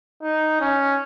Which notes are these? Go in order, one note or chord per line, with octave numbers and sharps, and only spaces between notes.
D#4
C#4